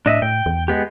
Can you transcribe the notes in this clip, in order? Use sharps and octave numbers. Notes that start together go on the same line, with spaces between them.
A2 D4 D#5 E5
A2 G5
E2
G#3 B3 G4